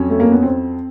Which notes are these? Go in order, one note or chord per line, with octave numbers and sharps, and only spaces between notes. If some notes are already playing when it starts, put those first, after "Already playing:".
Already playing: F2 F#3 C#4
A3
A#3
B3
C4